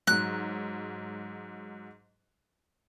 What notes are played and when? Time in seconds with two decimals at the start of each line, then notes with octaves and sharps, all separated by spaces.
0.07 G#2 F#3 F#6